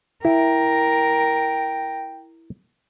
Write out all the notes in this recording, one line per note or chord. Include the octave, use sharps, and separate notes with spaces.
E4 A#4 G5